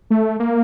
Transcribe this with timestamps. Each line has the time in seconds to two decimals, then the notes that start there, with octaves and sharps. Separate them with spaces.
0.10 A3
0.40 A#3